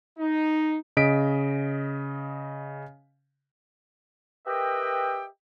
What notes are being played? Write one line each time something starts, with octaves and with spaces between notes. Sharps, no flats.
D#4
C#3 D#5 B6 D7
G4 A#4 B4 D#5 E5 G5